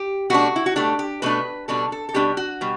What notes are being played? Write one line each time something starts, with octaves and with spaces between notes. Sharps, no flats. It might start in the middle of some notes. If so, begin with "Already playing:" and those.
Already playing: G4
B2 A3 D4 F#4
E4
F#4
B2 A3 D4 G4
G4
B2 A3 D4 B4
B2 G3 D4 A4
A4
A4
B2 G3 D4 G4
F#4
B2 G3